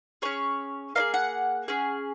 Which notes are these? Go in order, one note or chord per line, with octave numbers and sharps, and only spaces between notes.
C#4 G#4 C#5
A#3 D#4 G#4 F5
F#5
C#4 G#4